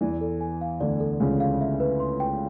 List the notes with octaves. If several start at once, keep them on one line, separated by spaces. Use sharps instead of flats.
E2 E3 D5
A4
G#5
F5
D2 D3 D5
A4
C#2 C#3 G#5
F5
E5
B4
C6
G5